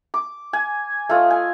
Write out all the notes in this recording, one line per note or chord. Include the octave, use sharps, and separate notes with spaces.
D6
G#5
A3 F4 D#5
G#5